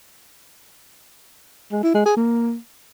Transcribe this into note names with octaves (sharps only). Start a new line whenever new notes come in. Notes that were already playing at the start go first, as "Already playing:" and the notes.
G#3
E4
G#3
G#4
A#3